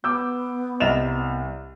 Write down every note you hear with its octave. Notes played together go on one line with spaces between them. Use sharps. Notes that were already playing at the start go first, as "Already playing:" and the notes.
B3 D6 E6 G6
C2 D#5 E5 F#5 E7 F7